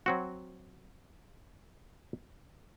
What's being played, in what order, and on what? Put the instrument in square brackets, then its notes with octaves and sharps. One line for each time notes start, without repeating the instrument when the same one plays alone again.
[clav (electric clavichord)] F#3 C4 F#4